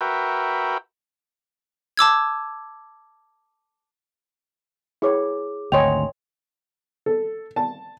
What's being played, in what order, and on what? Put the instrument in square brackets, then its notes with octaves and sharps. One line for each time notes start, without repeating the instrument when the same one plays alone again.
[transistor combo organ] F#4 A#4 B4 E5 G5
[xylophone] A5 D6 E6 G#6
[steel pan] E4 C#5 [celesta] G#4 D6
[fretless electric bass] G#1 D2 [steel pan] C#5 D#5 G5 [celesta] G#5 C6 F7
[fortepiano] A4
A5